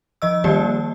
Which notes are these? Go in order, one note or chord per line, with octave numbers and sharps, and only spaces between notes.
F3 D#5 E6
D#3 G3 A#3 G4 D5